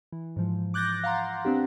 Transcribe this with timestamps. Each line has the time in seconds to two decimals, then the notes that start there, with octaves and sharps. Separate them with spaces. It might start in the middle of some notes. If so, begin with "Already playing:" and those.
0.13 E3
0.36 G#2 F3
0.74 D6 F#6 G6 A6 A#6
1.04 F5 F#5 A#5 C6
1.45 B3 C4 D4 G4